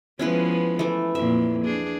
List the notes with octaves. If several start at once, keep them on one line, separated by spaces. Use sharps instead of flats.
F3 G#3 B3 C#4 E4 B4
E3 A3
F2 A#2 E5
D4 G#4